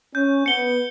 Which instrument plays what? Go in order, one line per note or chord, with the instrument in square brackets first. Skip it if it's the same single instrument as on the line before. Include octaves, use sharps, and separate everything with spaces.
[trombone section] C#4 [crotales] G6
[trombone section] B3 [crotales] C#7 G7